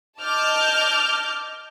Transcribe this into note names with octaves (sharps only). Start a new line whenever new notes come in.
D#5 A5 D6 F6 G6